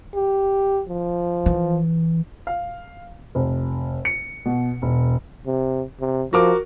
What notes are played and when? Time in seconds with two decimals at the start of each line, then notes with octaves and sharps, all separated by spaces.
0.15 G4
0.88 F3
1.46 E3
2.47 F5
3.35 F1
4.05 C#7
4.45 B2
4.82 E1
5.46 C3
6.00 C3
6.33 F3 F#4 A#4 D6